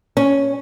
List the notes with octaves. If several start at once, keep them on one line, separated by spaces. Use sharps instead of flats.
C#4